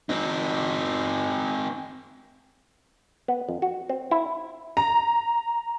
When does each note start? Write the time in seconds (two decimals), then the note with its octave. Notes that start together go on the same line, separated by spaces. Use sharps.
0.09 C4 D#4
3.28 B3
3.49 F2
3.62 F#4
3.89 C4
4.11 E4
4.77 A#5